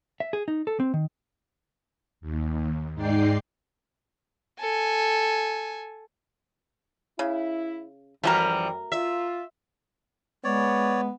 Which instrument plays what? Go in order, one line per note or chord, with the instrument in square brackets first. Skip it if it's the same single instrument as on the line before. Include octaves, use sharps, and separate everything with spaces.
[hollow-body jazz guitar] E5
G#4
D#4
A4
C4
D#3
[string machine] D#2
G#2 G#3 D#4 D5 G5 C7
[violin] A4 G#5
[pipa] C#3 [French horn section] E4
[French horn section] F#2 [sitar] E3 F3 G3 [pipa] A3 F#4 A#4
[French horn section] F4 [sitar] E5
[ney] G#3 [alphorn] B3 [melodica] C#5 D5